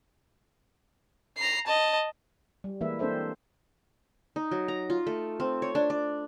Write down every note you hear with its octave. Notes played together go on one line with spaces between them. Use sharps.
A#5 C7
D#5 A5
G3
E3 G#3 A#3 E4 B4 E5
A#3 C4 D4 A4 C5 E5
D#4
F#3
A#5
F4
A3
C4
C#5
D4
D5